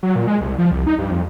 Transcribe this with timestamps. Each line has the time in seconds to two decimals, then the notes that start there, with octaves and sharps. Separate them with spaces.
0.03 F#3
0.16 A#2
0.27 G#3
0.41 C2
0.59 F3
0.71 C2
0.87 D#4
0.99 G2
1.11 F2